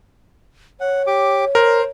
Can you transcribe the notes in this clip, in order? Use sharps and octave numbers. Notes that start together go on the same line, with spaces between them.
C#5 F#5
G4 D6
A#4 C5